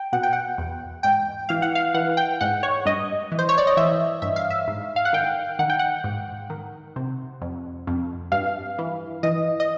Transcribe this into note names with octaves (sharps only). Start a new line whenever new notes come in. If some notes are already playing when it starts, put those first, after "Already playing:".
Already playing: G5
B2 F#5
G5
F#5
E2
G#2 G5
E3 F5
F#5
F5
E3 F#5
G5
G#2 F#5
C#5
G2 D#5
E3
C5
C#5
D5
D#5
E3 E5
G2 E5
F5
E5
G#2
F5
F#5
D#3 G5
D#3 F#5
G5
F#5
G#2
D#3
C3
F2
F2
G2 F5
E3
E3 D#5
D#5